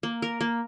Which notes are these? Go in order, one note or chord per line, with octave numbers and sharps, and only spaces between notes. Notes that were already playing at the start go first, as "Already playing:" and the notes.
A#3
A#4
A#3